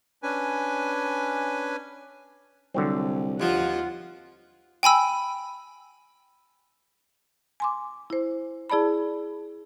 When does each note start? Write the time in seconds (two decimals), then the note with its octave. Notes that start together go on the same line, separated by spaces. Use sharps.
0.23 C#4 D4 B4 G#5
2.74 C2 D3 F#3 C4
3.40 D#2 F3 F4 F#5
4.83 G5 G#5 B5 E6
7.60 G#5 C6 D6
8.10 E4 C5
8.70 E4 G#4 D5 A5 B5